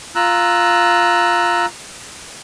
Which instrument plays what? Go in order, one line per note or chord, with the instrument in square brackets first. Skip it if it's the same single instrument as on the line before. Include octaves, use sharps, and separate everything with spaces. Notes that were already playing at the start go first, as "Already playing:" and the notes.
[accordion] F4 A#5 E6 F#6